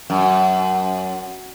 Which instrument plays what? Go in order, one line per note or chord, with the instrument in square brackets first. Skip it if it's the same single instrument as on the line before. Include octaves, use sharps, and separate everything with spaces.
[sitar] F#2